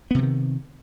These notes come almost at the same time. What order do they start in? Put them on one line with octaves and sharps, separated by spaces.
B3 C3 E3 D#3